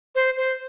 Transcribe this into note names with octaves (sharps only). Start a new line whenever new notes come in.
C5
C5